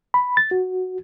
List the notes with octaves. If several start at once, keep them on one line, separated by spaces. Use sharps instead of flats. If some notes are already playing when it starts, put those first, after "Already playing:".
B5
A6
F#4